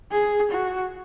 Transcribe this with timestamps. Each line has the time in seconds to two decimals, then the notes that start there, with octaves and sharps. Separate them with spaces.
0.12 G#4
0.52 F#4